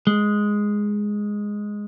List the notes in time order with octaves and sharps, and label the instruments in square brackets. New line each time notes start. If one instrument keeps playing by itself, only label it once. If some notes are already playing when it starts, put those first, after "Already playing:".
[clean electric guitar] G#3